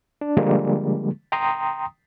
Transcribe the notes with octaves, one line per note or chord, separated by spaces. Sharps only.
D4
D3 F3 G3 G#3 A#3
G5 A#5 C6 D#6